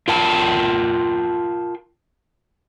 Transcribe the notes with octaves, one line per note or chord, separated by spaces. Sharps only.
F4 A#4 G5 A5